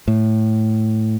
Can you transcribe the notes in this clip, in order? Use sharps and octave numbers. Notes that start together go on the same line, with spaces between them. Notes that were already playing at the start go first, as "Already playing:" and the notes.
A2